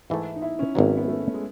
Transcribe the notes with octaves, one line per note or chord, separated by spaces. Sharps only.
G#2 E3 A3 E4
D#4
E4
C#4
G#1 G#2 F#3 B3
B3
A3
G#3